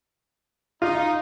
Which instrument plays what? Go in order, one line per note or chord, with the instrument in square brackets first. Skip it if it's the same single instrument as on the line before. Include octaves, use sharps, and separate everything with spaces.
[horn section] D#4 [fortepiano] F4